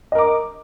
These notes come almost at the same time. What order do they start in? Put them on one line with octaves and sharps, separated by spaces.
D#5 A#4 D6